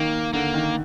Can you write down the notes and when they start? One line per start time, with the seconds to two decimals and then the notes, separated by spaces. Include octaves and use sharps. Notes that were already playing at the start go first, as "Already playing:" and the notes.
Already playing: D#3 A#3
0.33 D3 A#3
0.54 D#3